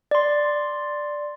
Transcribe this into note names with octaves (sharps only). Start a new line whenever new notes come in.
D5 C6